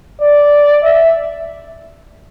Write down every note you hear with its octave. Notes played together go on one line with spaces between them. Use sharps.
D5
E5